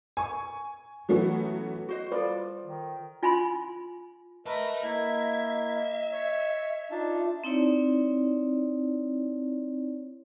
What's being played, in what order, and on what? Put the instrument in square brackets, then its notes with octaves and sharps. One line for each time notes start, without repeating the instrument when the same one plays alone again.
[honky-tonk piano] G#5 C#6
E3 F#3 A3 B3 C#4 F#4
[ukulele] F#4 C5 D#5
[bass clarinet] G3 [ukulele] F4 [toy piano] A4 C5 [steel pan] B4 D5
[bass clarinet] D#3
[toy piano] F4 G#5 B5 C6
[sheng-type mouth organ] A#4 B4 [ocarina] D#5 [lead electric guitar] E5 A5
[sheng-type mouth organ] A#3 E4 [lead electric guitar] E5
[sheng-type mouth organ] C#5
[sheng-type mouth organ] D4 D#4 A5 [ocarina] F4
[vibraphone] C4 D#4 E4 C#5 D5